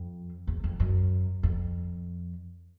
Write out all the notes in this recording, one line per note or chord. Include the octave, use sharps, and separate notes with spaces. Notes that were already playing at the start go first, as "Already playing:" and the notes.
Already playing: F2
E2
F2
F#2
F2